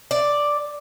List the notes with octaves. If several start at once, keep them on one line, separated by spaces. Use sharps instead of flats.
D5